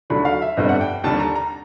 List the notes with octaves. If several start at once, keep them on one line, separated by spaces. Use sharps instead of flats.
D#2 D3 F#3 A3 B5
F5
E5
G1 F2 D3 G3 D#5
F#5
G5
D#2 D3 G3 A5
A#5
A#5